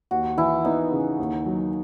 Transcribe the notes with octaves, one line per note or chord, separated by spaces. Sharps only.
D#2 F#4
E3 E4
B3 D#4
C#3
D#2
F#3